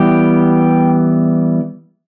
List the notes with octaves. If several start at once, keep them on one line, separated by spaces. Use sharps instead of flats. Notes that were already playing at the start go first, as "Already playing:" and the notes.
Already playing: E3 G3 B3 G4